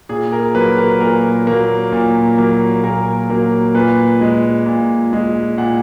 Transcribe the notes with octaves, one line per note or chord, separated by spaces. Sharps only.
A#2 G#4
A#4
F#3 A#3 B4
A#4
A#2 A#4
F#3 A#3
A#2
F#3 A#3
A#2 A#4
F#3 A#3
A#2 B4
G#3
A#2
G#3
A#2 F#5